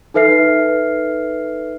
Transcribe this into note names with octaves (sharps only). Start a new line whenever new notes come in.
D#4 A4 B4 E5 F6 C7